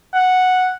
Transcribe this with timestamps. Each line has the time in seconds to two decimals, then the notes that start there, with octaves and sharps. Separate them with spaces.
0.14 F#5